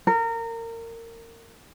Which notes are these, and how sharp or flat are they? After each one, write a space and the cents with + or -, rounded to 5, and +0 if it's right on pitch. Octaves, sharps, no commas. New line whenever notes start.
A#4 -25